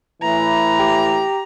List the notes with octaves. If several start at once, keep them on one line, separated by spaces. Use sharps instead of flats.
A2 E3 A#5
G4